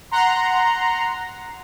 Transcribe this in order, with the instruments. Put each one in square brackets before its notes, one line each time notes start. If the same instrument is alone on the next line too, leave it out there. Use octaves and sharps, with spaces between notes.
[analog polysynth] F#5 A#5 C6